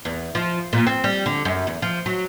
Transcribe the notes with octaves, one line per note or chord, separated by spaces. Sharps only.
E2
F3
A#2
C4
G3
D3
F#2
E2
F3
F#3